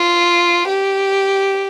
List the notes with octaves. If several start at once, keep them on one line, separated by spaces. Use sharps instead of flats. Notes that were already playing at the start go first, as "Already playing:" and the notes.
Already playing: F4
G4